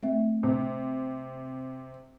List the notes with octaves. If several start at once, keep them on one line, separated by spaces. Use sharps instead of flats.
A3 C4 E5
C3